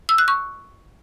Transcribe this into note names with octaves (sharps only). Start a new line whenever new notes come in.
E6
F#6
C#6